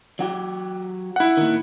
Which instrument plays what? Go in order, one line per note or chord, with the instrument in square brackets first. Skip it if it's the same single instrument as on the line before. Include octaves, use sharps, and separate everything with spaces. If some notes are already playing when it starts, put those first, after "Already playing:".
[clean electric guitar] F#3 F#4 G4
[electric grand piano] E4 F#5
[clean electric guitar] A#2 D#3